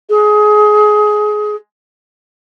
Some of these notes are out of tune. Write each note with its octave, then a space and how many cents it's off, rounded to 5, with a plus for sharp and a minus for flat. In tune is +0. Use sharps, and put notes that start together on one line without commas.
G#4 +20